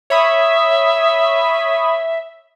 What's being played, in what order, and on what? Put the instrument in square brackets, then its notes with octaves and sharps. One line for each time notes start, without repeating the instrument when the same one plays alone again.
[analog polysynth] C#5 B5 D#6 [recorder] E5